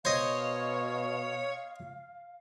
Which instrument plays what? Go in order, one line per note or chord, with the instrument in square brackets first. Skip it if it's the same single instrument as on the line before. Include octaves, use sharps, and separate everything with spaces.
[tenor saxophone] B2 [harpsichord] C5 D#5 [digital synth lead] C#5 [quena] F5